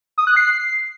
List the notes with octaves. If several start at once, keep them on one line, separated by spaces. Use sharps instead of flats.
D#6
F#6
C7